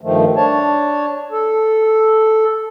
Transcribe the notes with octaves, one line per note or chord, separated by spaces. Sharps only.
G2 D#3 F3 A3
D4 C#5 A5
A4